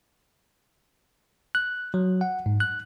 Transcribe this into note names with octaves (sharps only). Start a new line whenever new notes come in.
F#6
F#3
F#5
G#2
F#6